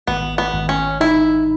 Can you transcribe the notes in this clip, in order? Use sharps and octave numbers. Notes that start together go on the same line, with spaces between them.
G#1 B3
B3
G#1
C#4
D#4 E4